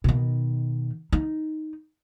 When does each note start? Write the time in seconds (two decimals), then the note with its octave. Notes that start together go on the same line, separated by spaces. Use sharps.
0.04 B2 D#3
1.12 D#4